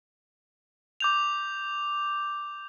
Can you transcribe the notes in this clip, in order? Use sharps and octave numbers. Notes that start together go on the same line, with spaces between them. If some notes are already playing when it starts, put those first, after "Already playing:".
D6 G6 F7